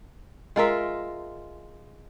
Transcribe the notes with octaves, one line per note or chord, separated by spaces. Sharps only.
G#3 F4 A#4 E5